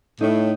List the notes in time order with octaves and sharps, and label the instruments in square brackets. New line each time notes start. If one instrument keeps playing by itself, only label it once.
[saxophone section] A2 [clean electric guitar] D#4